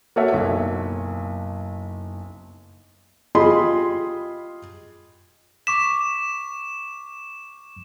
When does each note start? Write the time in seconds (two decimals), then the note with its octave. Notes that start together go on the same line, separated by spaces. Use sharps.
0.16 A#3 F#4 A4 C#5 E5
0.32 F#1 B1
3.35 F4 G4 G#4 D#5 B5 C6
5.67 C#6 D6 B6 E7